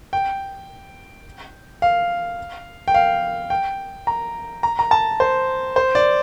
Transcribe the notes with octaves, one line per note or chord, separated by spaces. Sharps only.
G5
F5
G5
F5
G5
A#5
A#5
A#5
A5
C5
C5
D5